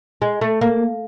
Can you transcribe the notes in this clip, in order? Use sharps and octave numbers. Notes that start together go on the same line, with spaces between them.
G#3
A3
A#3